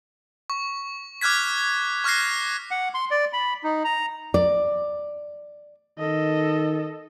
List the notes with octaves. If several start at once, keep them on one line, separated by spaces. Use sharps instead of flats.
C#6
D6 F6 F#6 G#6 B6
C#6 F6 F#6 A#6 C7
F#5
C6
D5
B5
D#4
A#5
D5
D#3 A4 D#5